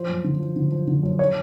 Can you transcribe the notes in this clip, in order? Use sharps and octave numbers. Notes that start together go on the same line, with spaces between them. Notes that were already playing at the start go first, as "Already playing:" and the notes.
Already playing: F3 C5
F#2
D3
F3
D3
F3
D3
F#2
C#5